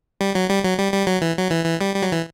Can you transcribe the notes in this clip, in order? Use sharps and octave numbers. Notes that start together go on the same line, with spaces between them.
G3
F#3
G3
F#3
G3
G3
F#3
E3
F#3
E3
E3
G3
G3
F#3
E3